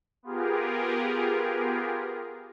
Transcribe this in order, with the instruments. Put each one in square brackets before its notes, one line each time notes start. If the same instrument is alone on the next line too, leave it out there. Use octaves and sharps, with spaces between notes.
[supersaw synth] B3 F4 G4 G#4 A#4